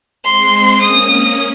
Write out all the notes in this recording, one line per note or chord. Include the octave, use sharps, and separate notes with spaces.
G#3 C4 C6
A#3 C#4 D#6
A#3 C#4